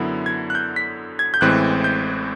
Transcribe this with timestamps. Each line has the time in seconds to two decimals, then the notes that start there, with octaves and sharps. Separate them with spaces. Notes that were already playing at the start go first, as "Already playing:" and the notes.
Already playing: F#2 D3 F#3 B3 E4
0.26 G#6
0.50 F#6
0.55 G6
0.76 B6
1.19 G#6
1.34 G6
1.41 A1 A2 E3 G#3 C4 F#6
1.84 G6